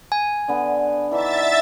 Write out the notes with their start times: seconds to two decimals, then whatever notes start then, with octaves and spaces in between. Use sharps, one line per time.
0.12 G#5
0.48 D3 B3
1.12 E3 D4 D#4 E5 A6